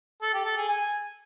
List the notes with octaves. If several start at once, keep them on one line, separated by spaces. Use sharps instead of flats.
A4
G4
A4
G#4
G#5